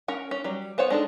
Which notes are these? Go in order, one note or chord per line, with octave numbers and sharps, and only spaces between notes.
C#4 A#4 F#5
C#4
F#3 G3
B3 C5 C#5 F#5
G#3 D4 D#4 A4